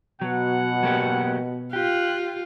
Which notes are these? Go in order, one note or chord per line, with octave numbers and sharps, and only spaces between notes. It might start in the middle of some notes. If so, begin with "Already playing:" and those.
B2 F#3 F#5
F#3 A#3 G4
F4 G4 F#6